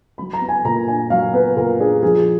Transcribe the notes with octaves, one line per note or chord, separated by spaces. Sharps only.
F#3 B5
A#5
B3
G#5
A#2 A#5
D4 G#5
F#3 F5
B3 B4
A#2 A#4
D4 G#4
F3 G#4